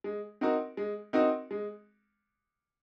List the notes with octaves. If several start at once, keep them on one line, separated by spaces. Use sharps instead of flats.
G#3
C4 D#4 F#4 A#4
G#3
C4 D#4 F#4 A#4
G#3